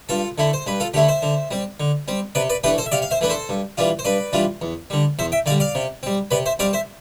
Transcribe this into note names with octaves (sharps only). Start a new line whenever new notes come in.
G2 F4 A4
D3 A3 E4
C5
G2 B4
F4 A4
D3 A3 E4 G4
C5 E5
D3
G3 C4
D3
G3 C4
C3 B4 D5
B4 D5
E3 A3 D4 G4 B4
A4 C5
E5
C3 D5 F5
F5
C5 E5
E3 A3 D4 B4
A4 C5
G2
E3 G3 D4 F4
C5
G2 B4 D5
E3 G3 D4 F4
E2
D3 G3
E2 C5 E5
E5 G5
D3 G3 D5 F5
D5 F5
C3
G3 C4
C3 B4 D5
C5 E5
G3 C4 D5 F5
C5 E5